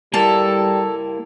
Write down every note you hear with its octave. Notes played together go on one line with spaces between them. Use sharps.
G3 A#3 E4 A4 A#4